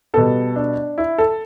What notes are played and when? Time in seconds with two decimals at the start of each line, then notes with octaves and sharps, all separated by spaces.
0.14 B2 G3 B3 A4
0.56 D4
0.98 E4
1.18 A4